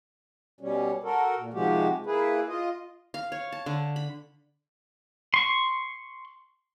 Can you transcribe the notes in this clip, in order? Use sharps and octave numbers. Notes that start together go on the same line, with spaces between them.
B2 G3 C#4
F#4 A4 A#4
A#2
C3 D#3 F3 G#3 F#4 G4
A#3 E4 G#4 B4
F4 D#5
F5
C#5
A5
D3
B5
C6 C#6